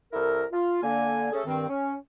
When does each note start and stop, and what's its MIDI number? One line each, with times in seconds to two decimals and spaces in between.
0.13 0.44 36
0.13 0.44 64
0.13 0.44 69
0.13 0.44 70
0.52 0.82 65
0.83 1.28 50
0.83 1.28 58
0.83 1.28 80
1.32 1.43 57
1.32 1.43 61
1.32 1.43 68
1.32 1.43 69
1.46 1.66 43
1.46 1.66 51
1.46 1.66 60
1.69 1.95 61